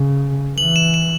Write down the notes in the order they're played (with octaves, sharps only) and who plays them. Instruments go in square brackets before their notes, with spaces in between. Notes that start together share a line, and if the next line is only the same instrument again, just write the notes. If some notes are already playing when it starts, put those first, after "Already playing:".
Already playing: [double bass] C#3
[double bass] E3 [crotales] F#7
[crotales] E7
E7